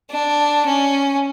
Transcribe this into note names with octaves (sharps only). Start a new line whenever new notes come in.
D4
C#4